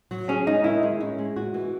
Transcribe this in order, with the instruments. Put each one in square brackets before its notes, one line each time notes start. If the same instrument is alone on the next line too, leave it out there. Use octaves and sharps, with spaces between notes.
[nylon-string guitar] F#3
[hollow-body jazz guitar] C#4 [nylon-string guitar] G#4
[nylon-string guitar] G#3 [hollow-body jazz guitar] D#4
[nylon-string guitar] D#3 [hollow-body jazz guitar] E4
[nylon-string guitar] G#3
C#4
G#3
F#4
E3